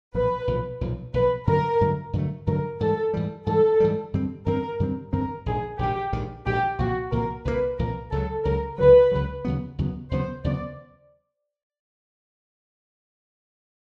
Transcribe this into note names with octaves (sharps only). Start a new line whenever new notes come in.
B1 A#2 F3 B4
B1 A#2 F3
B1 A#2 F3
B1 A#2 F3 B4
G2 D3 F#3 A3 A#4
G2 D3 F#3 A3
G2 D3 F#3 A3
G2 D3 F#3 A3 A#4
G#2 E3 G3 A4
G#2 E3 G3
G#2 E3 G3 A4
G#2 E3 G3
G2 D#3 G3 C4
G2 D#3 G3 C4 A#4
G2 D#3 G3 C4
G2 D#3 G3 C4 A#4
A#1 G#2 D#3 G#4
A#1 G#2 D#3 G4
A#1 G#2 D#3
A#1 G#2 D#3 G4
C2 A#2 F3 A#3 F#4
C2 A#2 F3 A#3 A#4
C2 A#2 F3 A#3 B4
C2 A#2 F3 A#3 A#4
C#2 C#3 F#3 A4
C#2 C#3 F#3 A#4
C#2 C#3 F#3 B4
C#2 C#3 F#3
D#2 C#3 F#3 B3
D#2 C#3 F#3 B3
D#2 C#3 F#3 B3 C5
D#2 C#3 F#3 B3 D5